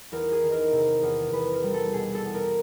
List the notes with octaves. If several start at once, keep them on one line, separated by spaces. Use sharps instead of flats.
E2 A#4
G#4
D#3
A#4
C3
E2
E2 B4
A#4
G3
A4
B2 G#4
A4
E2
A#4